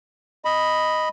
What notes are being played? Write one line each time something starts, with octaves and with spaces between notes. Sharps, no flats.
D#5 B5